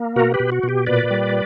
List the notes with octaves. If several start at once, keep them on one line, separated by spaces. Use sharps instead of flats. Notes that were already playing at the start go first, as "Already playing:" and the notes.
Already playing: A#3
B2 F#4 A#4
G4 B4
B2
F#4
B2
G4
A#2 B4 D5
G3